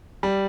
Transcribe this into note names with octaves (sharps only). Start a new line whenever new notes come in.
G3